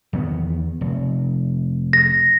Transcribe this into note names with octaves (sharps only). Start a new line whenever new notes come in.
E2 D#3 B3
F1
A#6